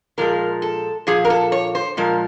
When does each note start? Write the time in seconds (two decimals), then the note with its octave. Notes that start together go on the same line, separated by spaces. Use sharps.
0.18 A#2 F3 G#3 A#4
0.62 A4
1.07 A#2 F3 G#4
1.25 A#4
1.30 A4
1.52 C#5
1.75 C5
1.97 A#2 F3 G#3 A#4